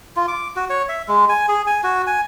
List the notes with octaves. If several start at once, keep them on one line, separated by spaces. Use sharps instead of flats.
F4
D6
F#4
C#5
E5
G#3
G#5
G#4
G#5
F#4
G#5